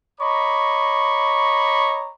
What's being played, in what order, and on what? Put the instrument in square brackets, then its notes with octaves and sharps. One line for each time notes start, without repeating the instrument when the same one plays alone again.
[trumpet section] C#5 D#5 A#5 B5 C#6 D6